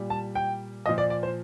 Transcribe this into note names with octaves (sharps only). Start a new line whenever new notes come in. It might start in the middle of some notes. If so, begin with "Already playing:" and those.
Already playing: A#2 G3
A5
G5
A#2 F3 D#5
D5
D5
C5